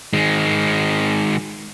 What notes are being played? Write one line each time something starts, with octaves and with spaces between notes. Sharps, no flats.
D#3 G#3